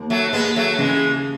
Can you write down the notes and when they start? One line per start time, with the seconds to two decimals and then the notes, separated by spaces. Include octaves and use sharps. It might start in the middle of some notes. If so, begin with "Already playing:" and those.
Already playing: D#2
0.10 F#3 A3
0.33 D#2 G#3 B3
0.56 F#3 A3
0.78 C#3 E3 G#3